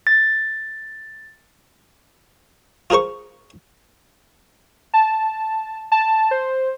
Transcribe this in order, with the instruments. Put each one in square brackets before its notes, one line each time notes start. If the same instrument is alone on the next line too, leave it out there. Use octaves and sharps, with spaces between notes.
[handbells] A6
[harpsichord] F4 G#4 A#4 C5 C#6
[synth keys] A5
A5
C5